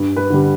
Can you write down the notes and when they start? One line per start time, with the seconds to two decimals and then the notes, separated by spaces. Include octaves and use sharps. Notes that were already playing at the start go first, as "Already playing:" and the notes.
Already playing: G2
0.17 B4
0.30 D3 G3